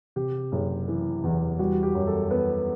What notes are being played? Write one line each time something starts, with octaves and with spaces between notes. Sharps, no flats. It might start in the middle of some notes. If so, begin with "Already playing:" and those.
C3 G4
F#1
E3
E2
G3 F#4
G4
F#2
A4
B3 B4